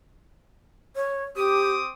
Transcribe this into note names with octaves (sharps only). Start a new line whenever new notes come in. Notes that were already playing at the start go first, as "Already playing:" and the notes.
C#5
C4 G4 D6 D#6